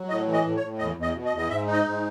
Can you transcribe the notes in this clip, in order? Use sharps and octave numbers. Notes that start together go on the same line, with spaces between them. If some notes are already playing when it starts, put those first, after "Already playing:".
Already playing: F#3
A2 D#5
E3
D#5
A2
C#5
A2
E2 D#5
E2
D#5
B2
D#5
E2
D#5
G#2 E5
D#4
D#5
G#2